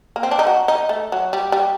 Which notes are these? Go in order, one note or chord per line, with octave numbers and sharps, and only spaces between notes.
A#3
C4
D4
D#4
F#4
D#4
A3
F#3
G3
G3